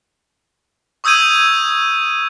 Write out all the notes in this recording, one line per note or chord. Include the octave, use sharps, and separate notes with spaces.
C#6 D#6 E6 G6 G#6 D#7